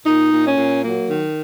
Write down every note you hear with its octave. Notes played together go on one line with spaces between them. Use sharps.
A#2 D#4
A#2
C#4
A#2
F#3 A#3
D#3